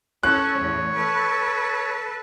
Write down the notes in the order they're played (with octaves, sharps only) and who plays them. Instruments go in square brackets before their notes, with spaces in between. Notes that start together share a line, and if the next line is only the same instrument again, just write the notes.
[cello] C#4 A4 [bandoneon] C#5 [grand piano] F#6
[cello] E2 A2
A4 B4